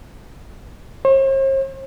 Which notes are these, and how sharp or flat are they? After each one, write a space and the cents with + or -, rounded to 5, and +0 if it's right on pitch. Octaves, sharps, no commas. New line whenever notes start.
C5 +45